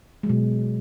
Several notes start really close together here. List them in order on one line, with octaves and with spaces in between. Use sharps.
G#3 F#3 B2